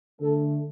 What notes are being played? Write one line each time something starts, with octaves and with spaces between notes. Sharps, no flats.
D3 A3 A4